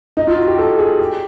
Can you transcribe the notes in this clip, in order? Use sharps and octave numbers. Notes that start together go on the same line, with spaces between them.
D#4
F4
F#4
G4
A4
G#4
G4